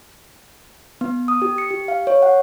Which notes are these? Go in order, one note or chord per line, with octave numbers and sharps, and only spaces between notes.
B3
D#6
G4
C#7
G4
F5
C#5
F#5